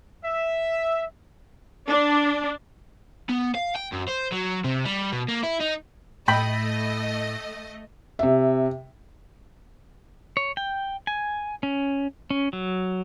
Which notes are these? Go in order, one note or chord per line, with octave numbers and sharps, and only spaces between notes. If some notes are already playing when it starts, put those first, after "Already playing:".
E5
D4
B3
F5
G5
F#2
C5
F#3
C3
G3
B2
A#3
E4
D#4
A2 A3 D#5 G5 B5
C3 E5
C#5
G5
G#5
C#4
C#4
F#3